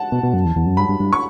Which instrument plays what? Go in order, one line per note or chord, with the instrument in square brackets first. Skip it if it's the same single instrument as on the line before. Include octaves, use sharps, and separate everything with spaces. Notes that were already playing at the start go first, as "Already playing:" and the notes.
Already playing: [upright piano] F#5 A5
[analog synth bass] B2
B2
F#2
E2
E2
F#2
[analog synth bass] G2 [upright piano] B5
[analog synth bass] G2
G2
[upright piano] C#6